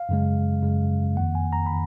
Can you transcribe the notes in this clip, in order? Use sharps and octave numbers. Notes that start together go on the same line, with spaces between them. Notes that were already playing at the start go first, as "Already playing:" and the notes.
Already playing: F5
F#2 C#3 G#3
F#2 C#3 G#3
F2 D#3 A#3 F#5
G#5
A#5
D#3 B5